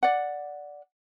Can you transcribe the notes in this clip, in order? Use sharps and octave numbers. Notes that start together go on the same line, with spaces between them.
D5 F#5